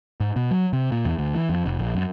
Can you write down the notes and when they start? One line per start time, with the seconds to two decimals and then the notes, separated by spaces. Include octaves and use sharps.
0.20 G#2
0.36 B2
0.51 F#3
0.73 C3
0.92 A#2
1.05 E2
1.18 D2
1.35 E3
1.49 F2
1.66 F1
1.79 A#1
1.95 F#2